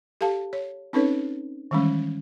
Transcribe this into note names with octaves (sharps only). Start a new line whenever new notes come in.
G4 A4 F5 A5
C#5
C4 C#4 D#4 A4 B4 C#5
D#3 E3 G3 G#3 C#4